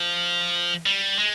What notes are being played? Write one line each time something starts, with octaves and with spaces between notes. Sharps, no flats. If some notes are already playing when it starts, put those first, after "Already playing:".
Already playing: F3
G3
G#3